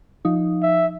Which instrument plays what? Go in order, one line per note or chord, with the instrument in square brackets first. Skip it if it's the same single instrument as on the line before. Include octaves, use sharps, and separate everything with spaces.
[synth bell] F3 D#4
[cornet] E5